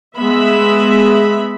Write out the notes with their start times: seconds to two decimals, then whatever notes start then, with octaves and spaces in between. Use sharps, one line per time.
0.18 G#3 B3 E5 B5